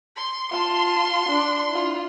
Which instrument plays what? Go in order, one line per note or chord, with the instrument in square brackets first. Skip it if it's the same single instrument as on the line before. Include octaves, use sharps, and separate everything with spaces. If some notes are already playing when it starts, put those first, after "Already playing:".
[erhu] C6
[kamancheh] F4 A5 [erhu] C6
[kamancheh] D4
E4 F4